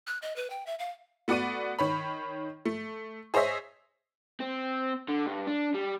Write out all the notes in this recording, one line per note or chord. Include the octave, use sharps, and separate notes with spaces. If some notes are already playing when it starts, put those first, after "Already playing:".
F#6
D#5
B4
G5
E5
F5
A3 B3 F#4 D5 F#5 D#7
D#3 C#5 B5
A3
G#4 C5 C#5 D#5 E5
C4
D3
G2
D4
G3